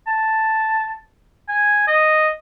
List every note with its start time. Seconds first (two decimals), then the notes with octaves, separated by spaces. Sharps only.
0.07 A5
1.49 G#5
1.87 D#5